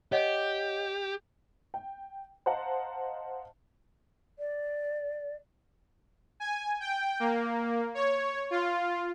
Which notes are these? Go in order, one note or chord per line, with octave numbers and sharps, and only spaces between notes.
G4 C#5 D#5 F#5
G5
C5 D#5 F5 F#5 A5 A#5
D5
G#5
G5
A#3
C#5
F4